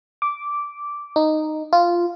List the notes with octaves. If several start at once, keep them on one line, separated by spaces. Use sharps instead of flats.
D6
D#4
F4